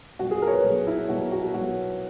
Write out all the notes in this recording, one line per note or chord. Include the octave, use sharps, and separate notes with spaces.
B1 B2 F#4
G#4
A#4
C#5
B4
B1 B2 G#4
E4
B1 B2 F#4
F#4
B1 B2 F#4